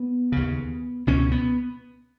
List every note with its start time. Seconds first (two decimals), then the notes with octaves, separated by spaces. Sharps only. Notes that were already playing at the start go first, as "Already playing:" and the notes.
Already playing: B3
0.32 D#2 C#3
1.07 C#2 B2 C#4
1.32 B3